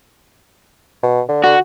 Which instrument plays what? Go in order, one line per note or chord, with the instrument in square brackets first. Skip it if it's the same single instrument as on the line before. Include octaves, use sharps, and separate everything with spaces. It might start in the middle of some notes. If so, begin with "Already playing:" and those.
[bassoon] B2
D3
[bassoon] D3 [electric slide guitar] F#4